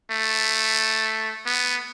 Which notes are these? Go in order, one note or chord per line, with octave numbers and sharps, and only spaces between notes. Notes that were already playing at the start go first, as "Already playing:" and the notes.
A3
B3